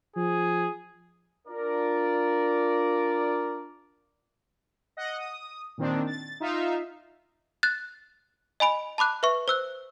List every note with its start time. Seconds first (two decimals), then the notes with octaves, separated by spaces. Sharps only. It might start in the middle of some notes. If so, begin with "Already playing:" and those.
0.16 F3 G#4
1.48 D4 F4 A#4 D5
4.97 D#5 F#5
5.17 D#6
5.78 A#2 D#3 C4 D4
6.07 A6
6.40 D#4 F4 E5 F5
7.63 F#6 A6
8.60 D#5 G#5 B5 D7
8.98 A5 B5 D6 F#6
9.23 B4 E5 C#6
9.48 C5 E6 F#6